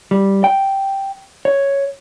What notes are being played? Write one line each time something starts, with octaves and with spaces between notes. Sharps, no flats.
G3
G5
C#5